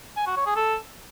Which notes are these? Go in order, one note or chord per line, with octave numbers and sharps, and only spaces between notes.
G#5
F#4
C#5
G#4
A4